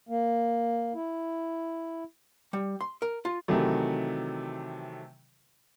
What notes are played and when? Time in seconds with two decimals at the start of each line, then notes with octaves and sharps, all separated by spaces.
0.09 A#3
0.95 E4
2.53 G3
2.81 C6
3.02 A#4
3.25 F4
3.48 C3 D#3 E3 F#3 A3